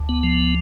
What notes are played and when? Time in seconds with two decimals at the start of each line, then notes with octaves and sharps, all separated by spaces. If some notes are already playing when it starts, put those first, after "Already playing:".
Already playing: D2
0.09 B3
0.23 F3